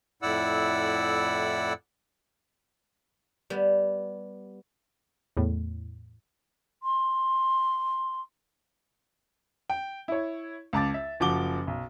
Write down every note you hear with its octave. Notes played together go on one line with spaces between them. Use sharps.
F2 A2 E4 D5 F#5 E6
G3 B3
E2 A2
C6
G5
E4 C#5
C#2 A5 D6 A6
E5
F#1 F3 F#4 D6 G7
B1